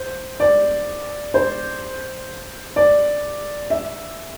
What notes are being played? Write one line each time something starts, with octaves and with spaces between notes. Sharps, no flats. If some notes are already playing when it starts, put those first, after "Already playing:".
Already playing: C5
D5
C5
D5
E5